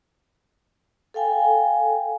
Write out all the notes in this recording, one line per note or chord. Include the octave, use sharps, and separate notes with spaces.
A4 F5 G5 G#5